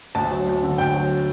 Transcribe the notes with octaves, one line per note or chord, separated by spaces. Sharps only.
D2 A5
F#3
D2
D3
D2 G5
F#3